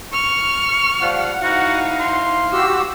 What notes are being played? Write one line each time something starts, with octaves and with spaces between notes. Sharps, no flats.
C#6 F6
F3 G3 F5 F#5
D#4 E4 F#4 C5 F5
C6
F#4 G4 F#5 E6